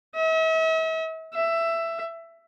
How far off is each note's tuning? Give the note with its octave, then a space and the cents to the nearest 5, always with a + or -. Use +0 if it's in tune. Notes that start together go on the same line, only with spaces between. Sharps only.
E5 -45
E5 +15